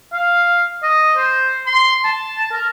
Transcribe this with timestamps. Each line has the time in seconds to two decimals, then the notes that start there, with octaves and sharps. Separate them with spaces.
0.13 F5
0.83 D#5
1.16 C5
1.67 C6
2.05 A5
2.52 A#4